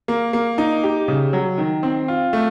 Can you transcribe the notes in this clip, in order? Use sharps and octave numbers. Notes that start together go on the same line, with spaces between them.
A#3
A#3
D#4
G4
C#3
F#3
D#3
C4
F4
A3